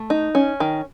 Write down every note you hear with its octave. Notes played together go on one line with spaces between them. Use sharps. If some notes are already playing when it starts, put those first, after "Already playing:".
Already playing: A3
D#4
C#4
D#3